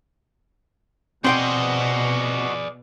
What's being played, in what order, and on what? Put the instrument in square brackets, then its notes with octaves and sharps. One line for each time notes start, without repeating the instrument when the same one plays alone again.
[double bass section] B2 [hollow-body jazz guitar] C4 C5 G5 [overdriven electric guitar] F#4 D#5 [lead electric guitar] G#4 D5